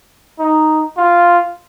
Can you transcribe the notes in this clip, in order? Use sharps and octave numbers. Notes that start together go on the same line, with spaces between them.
D#4
F4